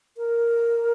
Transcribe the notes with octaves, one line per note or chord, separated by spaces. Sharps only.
A#4